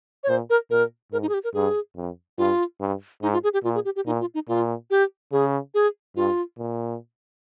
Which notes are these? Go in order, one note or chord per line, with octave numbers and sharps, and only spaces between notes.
C#5
A#2 C5
A#4
A#2 A#4
G#2 A#4
D#4
G#4
G4
A#4
G2 G#4
F2
G2 F4
G2
G#2 D#4
F4
G#4
G4
A#2 F4
G#4
G4
G4
A#2 D#4
F4
D#4
A#2 F4
G4
C#3 G#4
G#4
G2 F4
A#2